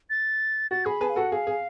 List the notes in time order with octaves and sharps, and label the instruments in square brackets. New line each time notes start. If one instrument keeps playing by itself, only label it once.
[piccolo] A6
[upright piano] F#4 [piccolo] A6
[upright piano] G#4 [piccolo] B5
[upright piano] G#4 B4 [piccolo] A5
[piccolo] F5
[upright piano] F#4 A4 [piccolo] F#5
[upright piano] G#4 [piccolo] F5
[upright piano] G#4